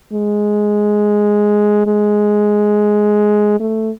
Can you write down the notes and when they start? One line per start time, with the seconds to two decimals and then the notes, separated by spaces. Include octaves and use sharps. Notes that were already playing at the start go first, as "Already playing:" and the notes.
0.13 G#3
1.87 G#3
3.60 A3